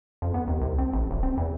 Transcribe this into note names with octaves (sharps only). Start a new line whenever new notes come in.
F2
B3
D#2
C2
C4
A1
D1
C4
E2